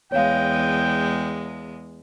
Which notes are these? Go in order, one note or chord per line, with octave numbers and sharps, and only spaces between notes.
E2 G#3 C#5 F5 G5